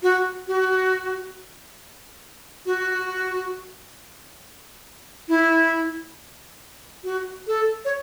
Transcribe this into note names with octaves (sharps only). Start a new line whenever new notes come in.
F#4
F#4
F#4
E4
F#4
A4
C#5